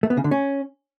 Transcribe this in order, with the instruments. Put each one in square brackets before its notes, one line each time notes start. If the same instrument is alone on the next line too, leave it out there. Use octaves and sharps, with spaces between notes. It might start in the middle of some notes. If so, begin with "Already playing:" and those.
[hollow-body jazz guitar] A3
B3
C#3
D3
C#4